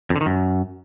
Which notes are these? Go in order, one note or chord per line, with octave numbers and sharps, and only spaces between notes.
F2
D3
D#3
F#2